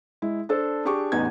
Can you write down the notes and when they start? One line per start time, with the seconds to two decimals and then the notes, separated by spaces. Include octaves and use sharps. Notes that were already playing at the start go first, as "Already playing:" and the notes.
0.22 G#3 E4
0.49 D4 A4 C5
0.85 D4 G4 G#4 C#6 D6
1.12 A1 E2 B3 D#4 G#6